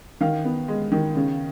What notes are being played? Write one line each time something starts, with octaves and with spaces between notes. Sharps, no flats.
D#3 F5
B3
G#3
D#3
C#3